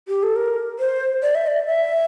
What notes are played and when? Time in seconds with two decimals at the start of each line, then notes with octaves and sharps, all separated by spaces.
0.08 G4
0.23 A4
0.36 A#4
0.79 C5
1.22 D5
1.35 E5
1.47 D5
1.66 E5